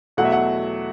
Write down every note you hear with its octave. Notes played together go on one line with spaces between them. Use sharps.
E2 B2 F#3 A3 F#5
E5
F#5